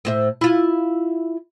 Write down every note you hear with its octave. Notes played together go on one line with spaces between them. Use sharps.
A2 C5 E5
E4 F4